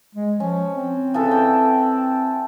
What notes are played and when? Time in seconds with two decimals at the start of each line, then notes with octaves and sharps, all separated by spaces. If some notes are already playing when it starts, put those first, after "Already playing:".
0.15 G#3
0.40 F3 C#4
0.73 C4
1.14 C#3 E3 A4
1.31 D5 G5